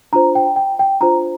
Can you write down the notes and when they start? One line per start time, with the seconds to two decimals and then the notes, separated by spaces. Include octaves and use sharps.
0.13 D4 F4 C5 A#5
0.35 G5
0.56 G5
0.79 G5
1.01 D4 F4 C5 A#5